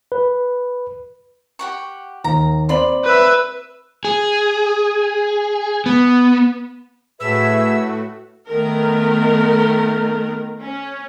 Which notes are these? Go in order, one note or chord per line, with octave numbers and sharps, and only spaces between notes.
B4
G4 F#5 C#6
D#2 A#5
C4 D5 B5 C6 F#7
B4 E5
G#4
B3
A2 A3 F#4 G#4 B4 E5 E6
D#3 A3 B3 A#4
C#4